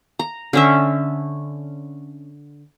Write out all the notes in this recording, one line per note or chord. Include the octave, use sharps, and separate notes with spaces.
A#5
D3 C#4 E5